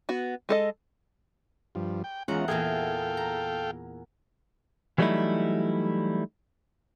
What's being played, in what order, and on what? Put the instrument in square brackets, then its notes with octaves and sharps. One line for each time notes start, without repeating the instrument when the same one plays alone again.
[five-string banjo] B3 F#4
G#3 A4 D#5
[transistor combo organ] G2 F3
G5
[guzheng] E2 F#5 A#5 [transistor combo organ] G#3 C#4 F4
[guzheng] E2 A#2 G#4 [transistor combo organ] A4 F5 G5
[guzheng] A#5
[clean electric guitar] E3 F#3 G3 A3 D#4 E4